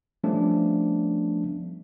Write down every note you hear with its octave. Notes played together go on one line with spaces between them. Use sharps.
F3 G3 A3 B3 C#4 D4